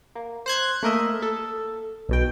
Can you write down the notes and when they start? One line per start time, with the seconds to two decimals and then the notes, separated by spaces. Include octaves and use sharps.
0.15 A#3
0.46 C5 F#6 G#6
0.83 A3 A#3 A#4 D#5 E5
1.22 A4
2.09 B1 B2 G5